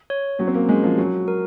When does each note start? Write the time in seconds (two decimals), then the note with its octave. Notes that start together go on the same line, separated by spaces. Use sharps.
0.10 C#5
0.39 F#3 C#4
0.47 C4
0.54 A#3
0.69 G#3 C#4
0.83 F3
0.98 F#3 F#4
1.28 A#4